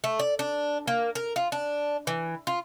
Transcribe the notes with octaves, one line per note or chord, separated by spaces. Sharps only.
A3
D5
D4
A#3
A#4
F4
D4
E3
F4